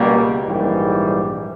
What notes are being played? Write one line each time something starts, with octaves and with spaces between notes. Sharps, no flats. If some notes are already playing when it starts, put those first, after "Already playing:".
Already playing: C#2 B2 G3 A#3
A#1 G#2 E3 G3